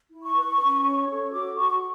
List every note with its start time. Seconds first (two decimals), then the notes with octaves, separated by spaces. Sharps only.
0.12 E4
0.24 C#6
0.36 B4
0.60 C#4
0.85 C#5
1.09 A4
1.33 F#4 D6
1.57 F#4 C#6